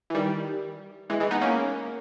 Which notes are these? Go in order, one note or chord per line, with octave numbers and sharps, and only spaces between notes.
E3
D#3 G3
E3 G#3
E3 G#3
B3 D#4
A#3 C#4